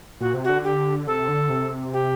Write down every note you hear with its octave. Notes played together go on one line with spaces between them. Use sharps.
A#2 F#4
C3
F#4
D3
G4
C3 A4
D3
C3
G4